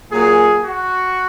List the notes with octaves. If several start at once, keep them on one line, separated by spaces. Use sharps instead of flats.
A#2 F#3 A#3 G#4
F#4